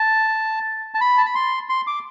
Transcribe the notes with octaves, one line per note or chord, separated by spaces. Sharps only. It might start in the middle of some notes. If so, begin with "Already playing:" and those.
Already playing: A5
A5
B5
A5
B5
C6
C6
D6